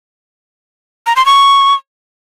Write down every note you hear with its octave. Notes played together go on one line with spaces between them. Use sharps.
A#5
C6
C#6